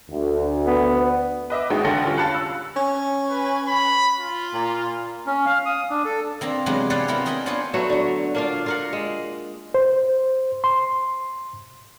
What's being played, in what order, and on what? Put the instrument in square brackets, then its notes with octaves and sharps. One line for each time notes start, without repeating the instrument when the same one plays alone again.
[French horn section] D2
[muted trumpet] B3
[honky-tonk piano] B4 D#5 E5 D6
G#1 D#2 G#3 D#4 F#4 G5
A1 D3 A4 G5 A#6 C#7
G3 C#4 F4
F5 A5 B5 F#6 C#7
E6
[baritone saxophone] C#4
[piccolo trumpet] B4
B5
F4
[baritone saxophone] A#2
[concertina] C#4
F5
D#6
D4
A4
[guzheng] A#3 C4 D4 A#5
C3 E3 F#3 G#3 B3 D4
G4 B4 D5 F5 F#5 G#5
C4 E4 G4 A#4
A#4 D#5 G5 G#5 B5
B3 D4 F4 C5 C#5 G#5
[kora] F#3 A3 B3 F#4
D3 F#3
A#3 D4 F4
F4 A#4 F#5
G#3
[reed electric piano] C5
C6